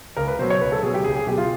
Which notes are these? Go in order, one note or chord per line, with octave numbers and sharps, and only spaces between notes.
C#2 A#4
B4
B2 F#3 C5
C#5
C#2 B4
A4
B2 F#3 G#4
G4
C#2 G#4
G#4
B2 F#3 G4
F4